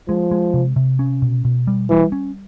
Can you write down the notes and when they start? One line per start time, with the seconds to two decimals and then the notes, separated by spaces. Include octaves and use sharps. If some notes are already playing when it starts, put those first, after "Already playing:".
0.08 F3 G#3
0.31 G#3
0.54 C3
0.76 C3
0.99 C#4
1.22 B2
1.45 B2
1.67 G3
1.90 E3 G3
2.12 C#4